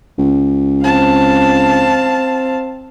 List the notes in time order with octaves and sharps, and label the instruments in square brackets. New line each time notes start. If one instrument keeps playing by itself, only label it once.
[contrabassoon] C#2
[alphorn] C4 [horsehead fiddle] F5 A5